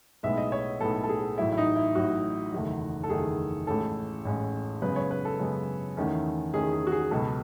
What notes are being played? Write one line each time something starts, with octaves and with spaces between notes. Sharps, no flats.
B1 A2 G#3 B3 E5
D#5
C#5
B1 A2 G#3 B3 A4
A4
G#4
A1 A2 F#3 E4
E4
D#4
E4
A1 A2 F#3 F#4
F#1 E2 D#3 A3
A4
F#1 E2 D#3 A3 G#4
A1 A2 G#3 C#4 A4
A1 A2 G#3 C#4
F#2 C#3 G#3 B3 B4
C#5
B4
A4
F#2 C#3 G#3 B3
E2 D#3 A3 C#4
E2 D#3 A3 C#4 G#4
G#4
F#4
G#4
C#2 B2 F#3 B3 A4